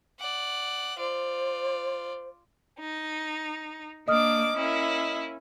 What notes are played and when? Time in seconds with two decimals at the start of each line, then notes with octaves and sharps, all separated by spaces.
0.20 D5 F#5
0.99 F4 C5 D5
2.79 D#4
4.08 A#3 D4 D#5 D6 D#6 F6
4.56 A#3 C#4 E4